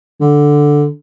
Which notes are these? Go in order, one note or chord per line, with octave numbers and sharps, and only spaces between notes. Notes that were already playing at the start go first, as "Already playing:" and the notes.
D3